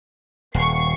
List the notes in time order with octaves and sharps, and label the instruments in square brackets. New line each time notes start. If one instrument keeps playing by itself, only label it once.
[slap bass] D#1 [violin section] C#6 C7